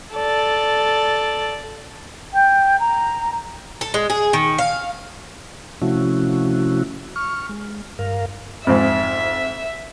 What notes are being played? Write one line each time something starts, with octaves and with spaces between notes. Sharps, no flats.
A4 D5
G5
A#5
A4
G#3
G#4
D#3
F5
C3 F3 A3 C#4 E4 F#4
C#6 F6
G#3
G2 A#4 F5
F2 G#2 E5